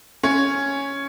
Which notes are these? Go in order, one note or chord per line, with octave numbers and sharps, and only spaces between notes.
C#4